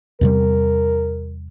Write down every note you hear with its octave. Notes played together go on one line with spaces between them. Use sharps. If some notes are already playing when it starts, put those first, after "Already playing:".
E2 C3 G3 A#4